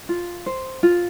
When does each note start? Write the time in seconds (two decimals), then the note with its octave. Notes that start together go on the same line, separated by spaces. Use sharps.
0.09 F4
0.46 C5
0.83 F4